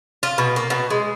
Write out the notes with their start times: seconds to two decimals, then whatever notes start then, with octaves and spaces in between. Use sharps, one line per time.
0.23 F4
0.38 B2
0.56 A#3
0.70 B2
0.90 G#3